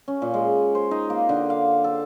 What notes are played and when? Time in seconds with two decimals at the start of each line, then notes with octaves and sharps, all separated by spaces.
0.08 C#4
0.22 A#2
0.34 G#3
0.75 C5
0.91 D#4
1.10 A#3
1.29 D3
1.50 F5
1.84 A4